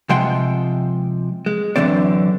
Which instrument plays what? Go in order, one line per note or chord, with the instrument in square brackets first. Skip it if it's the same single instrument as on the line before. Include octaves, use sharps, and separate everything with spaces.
[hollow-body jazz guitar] C3 F3 G#3 F#5 G5 C6
G#3
F#2 D3 E3 C4 D5